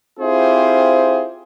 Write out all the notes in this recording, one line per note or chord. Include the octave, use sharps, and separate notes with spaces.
C4 E4 F4 G4 G#4 C5